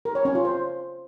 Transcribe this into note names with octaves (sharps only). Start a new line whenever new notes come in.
A#4
C#5
C#4
F4
C5